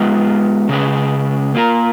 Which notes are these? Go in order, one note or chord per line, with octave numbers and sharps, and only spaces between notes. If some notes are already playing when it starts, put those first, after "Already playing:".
Already playing: G#3 B3 F4
C#3 G#3 C#4 G#4 B4
A#3 F4 A#4